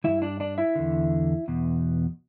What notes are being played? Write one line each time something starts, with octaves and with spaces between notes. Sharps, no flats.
G2 E3 E4 E5
D4 D5
D4 D5
E4 E5
E2 D3
E2 B2